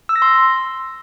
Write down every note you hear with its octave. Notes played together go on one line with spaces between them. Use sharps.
E6
A#6
C6